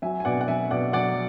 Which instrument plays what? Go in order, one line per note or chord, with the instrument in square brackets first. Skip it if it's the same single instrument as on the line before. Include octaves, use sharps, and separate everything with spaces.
[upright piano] F#3 E5 G#5
G#5
B2 D5 F#5
F#5
F#3 E5 G#5
B2 D5 F#5
F#3 D5 F#5